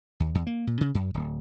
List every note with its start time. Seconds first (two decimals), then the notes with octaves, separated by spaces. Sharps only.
0.20 D#2
0.35 E2
0.47 A#3
0.67 A#2
0.81 C#3
0.95 F#2
1.14 D1